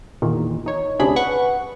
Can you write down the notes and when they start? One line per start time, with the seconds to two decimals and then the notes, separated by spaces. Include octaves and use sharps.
0.22 E2 A#2 D#3
0.66 D#4 C#5
0.99 D2 C3 C#4 D4 G#4 B5
1.16 B4 F#5 B5 C#6